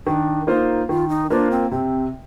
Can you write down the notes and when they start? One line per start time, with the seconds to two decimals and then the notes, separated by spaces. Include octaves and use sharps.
0.06 D#3 D4
0.47 A#3 D#4 F4 C5
0.89 D#3 F4
1.09 D#4
1.30 A#3 D4 F4 C5
1.51 C4
1.71 C3 C4